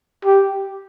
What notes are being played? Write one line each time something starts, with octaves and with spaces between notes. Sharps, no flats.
G4